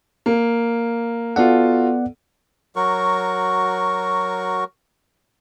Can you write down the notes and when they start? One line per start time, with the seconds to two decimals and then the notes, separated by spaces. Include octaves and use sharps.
0.26 A#3
1.36 B3 F4 F#4 A4 D5 F#5
2.76 F#3 F#4 A#4 C#6